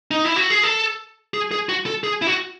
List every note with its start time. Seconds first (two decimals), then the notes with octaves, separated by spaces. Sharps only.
0.11 D#4
0.25 E4
0.36 F#4
0.50 G#4
0.64 A4
1.34 G#4
1.51 G#4
1.69 F#4
1.86 A4
2.04 G#4
2.22 E4
2.27 F#4